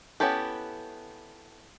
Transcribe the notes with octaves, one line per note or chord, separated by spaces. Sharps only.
B3 C#4 E4 G4 A4